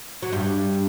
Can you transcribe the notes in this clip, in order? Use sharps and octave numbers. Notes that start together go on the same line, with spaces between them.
F#3
G2 G3